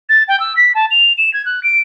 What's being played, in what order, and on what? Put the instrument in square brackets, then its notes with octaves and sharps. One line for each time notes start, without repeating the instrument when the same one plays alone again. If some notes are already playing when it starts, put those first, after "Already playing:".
[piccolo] A6
G5
E6
B6
A5
F7
E7
G#6
F#6
D7